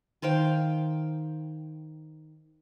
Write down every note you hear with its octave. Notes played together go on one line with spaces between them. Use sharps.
D#3 C5 F5 G5